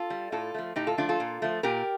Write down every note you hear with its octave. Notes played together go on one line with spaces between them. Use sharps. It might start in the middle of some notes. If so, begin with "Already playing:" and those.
Already playing: F4 A4
G3
A2 F4 A4
F3 A3
A2 D#4 G4
F4 A4
F3 A3 D4 F4
F4 A4
A#2
F3 A3
A#2 G4 A#4